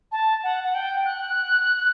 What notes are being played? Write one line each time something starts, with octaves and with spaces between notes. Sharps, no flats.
A5
F#5
F#5
G5
F#6